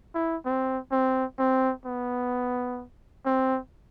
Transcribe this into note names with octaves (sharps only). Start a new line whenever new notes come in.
E4
C4
C4
C4
B3
C4